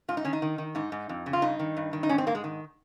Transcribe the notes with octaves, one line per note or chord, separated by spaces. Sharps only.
G#2 F4
D#4
D#3 C#4
D#4
D#3
D#3
G#2 D#4
G#2
F2
C#3
F4
G2 D#4
D#3
G2
D#3
D#4
G#2 C#4
C4
G#2 A#3
G#3
D#3